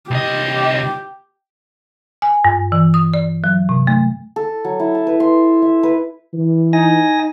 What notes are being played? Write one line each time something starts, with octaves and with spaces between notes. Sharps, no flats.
C2 G4 D#5
G#5
G2
E3
D#6
D5
F#3
C3
A3
A4
F#3
E4
A5
B4
C6
E5
B4
E3
D#4 G#5 A#6